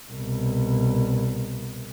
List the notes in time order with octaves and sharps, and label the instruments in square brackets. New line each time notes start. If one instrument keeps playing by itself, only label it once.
[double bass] C2 B2